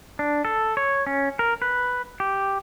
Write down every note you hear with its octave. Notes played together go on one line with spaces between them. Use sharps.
D4
A4
C#5
C#4
A#4
B4
G4